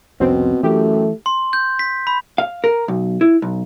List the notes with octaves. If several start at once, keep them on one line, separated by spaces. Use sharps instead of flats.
C2 F2 B2 C4 C#4
F#2 E3 A3 G4
C6
G6
B6
B5
F5
A#4
B1
E4
B1